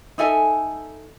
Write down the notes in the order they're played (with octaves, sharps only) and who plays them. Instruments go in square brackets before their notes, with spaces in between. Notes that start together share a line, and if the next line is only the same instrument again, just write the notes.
[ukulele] D#4 A4 E5 G#5